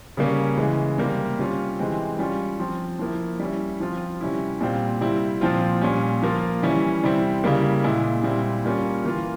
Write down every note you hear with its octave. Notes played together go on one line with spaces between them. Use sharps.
C#3 G3 A#3 C#4
C#3 E3 G#3
C3 G3 A#3
C3 G3 C#4 F4
C3 E3 G#3 C4
G3 C#4 F4
F3 C4 F4
F3 A#3 E4
G3 C#4 E4
F3 C4 F4
C3 G3 C#4 E4
A#2 G3 C4 F4
C3 G3 C4 E4
A#2 F3 C4 F4
A#2 G3 C#4
F3 A#3 F4
E3 G3 C#4 E4
C3 G3 C4 E4
C#3 G3 A#3 E4
A#2 G#3 E4
A#2 G3 C4 E4
G3 A#3 C#4 F4
E3 A#3 F4